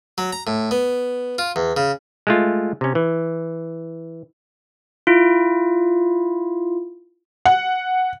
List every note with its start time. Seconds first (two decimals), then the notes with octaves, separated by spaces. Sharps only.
0.18 F#3
0.33 A#5
0.47 A2
0.71 B3
1.38 F4
1.56 E2
1.77 C#3
2.27 G#3 A3 F4
2.81 C3 C#4
2.95 E3
5.07 E4 F4
7.45 F#5